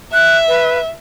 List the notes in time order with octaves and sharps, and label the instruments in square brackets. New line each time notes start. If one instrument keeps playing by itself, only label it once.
[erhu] E5 [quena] F#6
[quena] B4